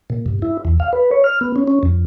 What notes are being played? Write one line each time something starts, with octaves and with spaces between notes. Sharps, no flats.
A#2
G2
E4
E2
F5
B4
C#5
F6
B3
C#4
C#4
F2